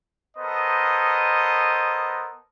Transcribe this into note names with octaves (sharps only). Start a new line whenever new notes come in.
B3 A4 A#4 C5 D#5